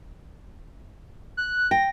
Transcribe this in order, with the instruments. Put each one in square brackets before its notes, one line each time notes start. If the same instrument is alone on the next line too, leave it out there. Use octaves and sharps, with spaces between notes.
[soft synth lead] F#6
[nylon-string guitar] G5 [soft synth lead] A#6